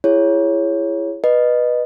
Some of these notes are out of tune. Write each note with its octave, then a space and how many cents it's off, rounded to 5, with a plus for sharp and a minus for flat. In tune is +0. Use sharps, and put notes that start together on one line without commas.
E4 +25 G#4 -15 C#5 +0
B4 -10 D#5 -20